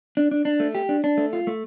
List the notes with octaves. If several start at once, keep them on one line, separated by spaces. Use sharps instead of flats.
D4
D4
D4
A3
G4
D4
D4
A3
F4
A3